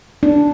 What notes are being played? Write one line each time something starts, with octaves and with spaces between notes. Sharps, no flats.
D4